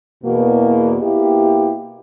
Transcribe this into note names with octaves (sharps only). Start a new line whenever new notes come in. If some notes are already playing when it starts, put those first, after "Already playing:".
E2 B2 A#3
B2 A#3 E4 G4